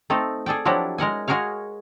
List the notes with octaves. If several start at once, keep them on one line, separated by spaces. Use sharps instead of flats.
A3 C4 D#4 A4
G#4 A4 D5 G5
F3 F#3 D4 E4 F#4 G4
G#3 A#4 F#5 G#5
G#3 F#4 G#4 A#4 C#5 F5